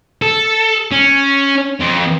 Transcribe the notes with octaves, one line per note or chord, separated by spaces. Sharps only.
A4
C#4
F2